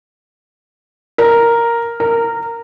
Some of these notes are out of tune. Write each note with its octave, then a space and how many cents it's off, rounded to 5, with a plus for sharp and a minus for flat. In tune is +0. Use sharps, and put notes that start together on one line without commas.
A#4 +0
A#4 -15